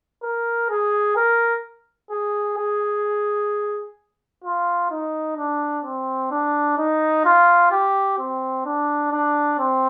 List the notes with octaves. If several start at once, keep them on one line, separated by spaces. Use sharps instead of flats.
A#4
G#4
A#4
G#4
G#4
F4
D#4
D4
C4
D4
D#4
F4
G4
C4
D4
D4
C4